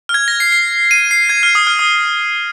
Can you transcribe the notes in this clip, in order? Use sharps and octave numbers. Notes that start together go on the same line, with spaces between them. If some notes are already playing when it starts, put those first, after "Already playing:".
F6
G#6
A#6
C7
C7
D#7
C7
G#6
F6
D#6
F6
D#6